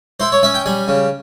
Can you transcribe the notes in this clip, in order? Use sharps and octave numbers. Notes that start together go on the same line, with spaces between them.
E4 C5
C#5
C#4 E5
G5
G3 G#5
C#3